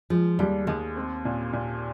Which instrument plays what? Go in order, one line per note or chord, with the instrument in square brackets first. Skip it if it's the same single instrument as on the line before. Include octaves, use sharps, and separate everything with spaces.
[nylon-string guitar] F3 [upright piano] G#3
[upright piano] D#2 [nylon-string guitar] G3
[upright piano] D#2 [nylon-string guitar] G#3
[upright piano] C4
A#2
A#2